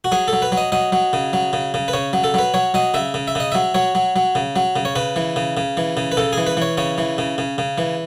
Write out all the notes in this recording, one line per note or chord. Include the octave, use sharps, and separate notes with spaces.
F#4
F#3 G#4
A4
F#3
B4
F#3
D#5
F#3 D#5
F#3
C#3
F#3
C#3
C#3
B4
C#3 C#5
F#3
A4
F#3 B4
F#3 C#5
F#3 D#5
C#3 E5
C#3
E5
C#3 D#5
F#3 E5
F#3 C#5
F#3
F#3
C#3
F#3
C#3
C#5
C#3 B4
E3
C#3
C#3
E3
C#3
B4
C#3 A4
E3 G#4
B4
E3 C#5
C#3 C#5
E3
C#3
C#3
C#3
E3